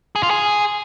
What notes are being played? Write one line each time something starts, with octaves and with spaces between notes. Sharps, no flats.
G#4
F4
G#4